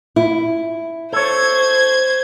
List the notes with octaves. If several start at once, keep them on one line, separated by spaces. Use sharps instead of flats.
E4
A4 C5 C#5 G#6